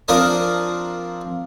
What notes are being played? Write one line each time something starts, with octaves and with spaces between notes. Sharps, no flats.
F3 C4 D4 A#4 D#6